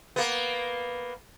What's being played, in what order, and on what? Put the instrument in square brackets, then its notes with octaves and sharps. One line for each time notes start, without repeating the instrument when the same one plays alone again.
[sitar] A#3 B3